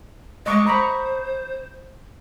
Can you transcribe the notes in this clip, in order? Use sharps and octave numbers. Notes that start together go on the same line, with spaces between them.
G#3 D#5 C#6 D6
C5 A#5 B5 C#6